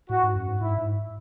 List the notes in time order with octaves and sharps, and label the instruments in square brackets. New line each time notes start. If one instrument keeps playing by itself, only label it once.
[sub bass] A2 [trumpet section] F#4
[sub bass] G#2
F#2
G#2
[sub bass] G#2 [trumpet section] E4
[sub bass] G#2